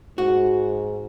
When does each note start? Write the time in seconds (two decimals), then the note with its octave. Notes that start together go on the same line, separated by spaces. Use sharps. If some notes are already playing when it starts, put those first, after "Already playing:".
0.18 G#2 F#4